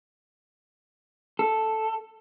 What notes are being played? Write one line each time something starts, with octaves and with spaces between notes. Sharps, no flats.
A4